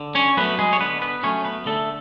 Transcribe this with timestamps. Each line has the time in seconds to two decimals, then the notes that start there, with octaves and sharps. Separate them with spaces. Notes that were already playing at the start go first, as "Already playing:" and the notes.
Already playing: D3
0.15 C#4 C#5
0.37 F#3 A3 B3 B4
0.59 G#3 G#4
0.73 C#5
0.80 D3 B3 B4
1.02 B3 B4
1.23 F#3 A3 C#4 C#5
1.45 B3 B4
1.66 D3 A3 A4